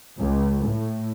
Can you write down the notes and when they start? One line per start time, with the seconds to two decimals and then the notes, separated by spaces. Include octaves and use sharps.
0.19 C#2
0.67 A2